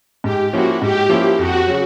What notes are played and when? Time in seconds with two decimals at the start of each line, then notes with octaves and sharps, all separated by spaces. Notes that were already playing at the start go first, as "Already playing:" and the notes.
0.24 G#2 G4
0.53 F3 A#3 C#4 E4 F#4
0.81 G#2 G4
1.10 F3 A#3 C#4 E4
1.39 F2 F#4
1.67 C#3 F#3